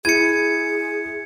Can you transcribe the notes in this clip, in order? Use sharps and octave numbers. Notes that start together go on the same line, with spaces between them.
E4 G#4 G#6 C#7 D#7